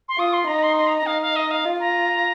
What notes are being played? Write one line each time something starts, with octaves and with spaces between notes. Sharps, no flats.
C6
F4 D#6
C6
D#4 A#5
C6
C6
A#5
A#5
D#4 F5
F5
D#5
F5
F4
A#5